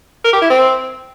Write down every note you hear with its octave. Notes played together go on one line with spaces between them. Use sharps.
A#4
G4
E4
C4